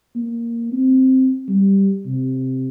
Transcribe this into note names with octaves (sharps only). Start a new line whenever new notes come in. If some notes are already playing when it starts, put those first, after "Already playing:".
A#3
C4
G3
C3